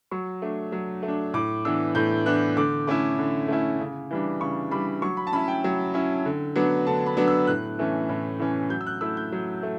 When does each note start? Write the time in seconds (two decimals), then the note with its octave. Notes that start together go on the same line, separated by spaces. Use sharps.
0.11 F#3 C#6
0.42 A3 D4
0.72 F#3
1.03 A3
1.08 D4
1.34 A2 D6
1.65 E3 B3 D4 E6
1.95 A2 G6
2.26 E3 B3 D4 F#6
2.57 D3 D6
2.87 A3 C#4 E4 D6
3.19 D3
3.48 A3 C#4 E4
3.80 C#3
4.11 E3 G3 D4
4.41 C#3 C#6
4.71 E3 G3 D4 B5
5.02 F#3 C#6
5.17 B5
5.27 A5
5.33 C#4 E4 B5
5.48 G5
5.64 F#3
5.94 C#4 E4
6.25 D3
6.56 F#3 B3 D4
6.87 D3 A5
7.06 B5
7.17 F#3 B3 D4
7.28 E6
7.47 A2 F#6
7.79 E3 A3 C#4
8.09 A2
8.39 E3 A3 C#4
8.70 F#3 G6
8.81 E6
8.87 F#6
9.01 A3 E4 E6
9.17 G6
9.32 F#3
9.63 A3